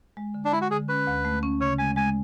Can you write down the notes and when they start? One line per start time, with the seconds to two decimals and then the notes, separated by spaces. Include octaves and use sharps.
0.17 G#3
0.34 D3
0.45 D4
0.53 G#3 E4
0.61 F#4
0.71 D3 G#4
0.88 C#4 B4
1.07 D2
1.25 A3
1.43 C#4
1.61 C#3 C#5
1.78 G#3 G#5
1.96 G#3 G#5